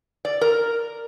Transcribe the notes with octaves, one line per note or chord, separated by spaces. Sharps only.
D5
A#4